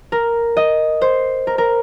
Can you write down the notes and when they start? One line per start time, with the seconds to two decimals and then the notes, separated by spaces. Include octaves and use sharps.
0.12 A#4
0.57 D#5
1.01 C5
1.47 A#4
1.58 A#4